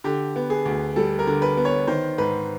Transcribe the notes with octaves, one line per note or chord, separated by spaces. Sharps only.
D3 G4
B3
G#4
D2
G3 A4
A#4
D3
B4
B3
C#5
D#3 C5
G#2 B4